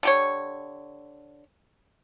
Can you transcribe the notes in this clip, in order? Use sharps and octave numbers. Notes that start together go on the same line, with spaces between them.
D3 G4 C#5